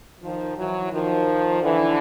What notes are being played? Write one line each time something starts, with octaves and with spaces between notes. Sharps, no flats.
D#3 F3
E3 F#3
D#3 F3
D3 E3